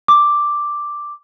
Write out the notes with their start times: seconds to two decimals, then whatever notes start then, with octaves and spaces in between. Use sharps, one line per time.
0.08 D6